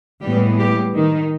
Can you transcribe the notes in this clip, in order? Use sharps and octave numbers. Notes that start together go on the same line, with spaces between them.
A2 E3 G3 G#3 B3 G4
G3 G4
D#3 D#4